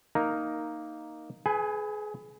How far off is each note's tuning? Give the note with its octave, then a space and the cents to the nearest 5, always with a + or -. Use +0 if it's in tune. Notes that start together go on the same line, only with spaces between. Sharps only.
A#3 +0 D#4 +0 A#4 +0
G#4 +30 B4 +15 G#5 -15